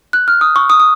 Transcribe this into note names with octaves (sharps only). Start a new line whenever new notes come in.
F#6
F6
D#6
C#6
D#6
D#6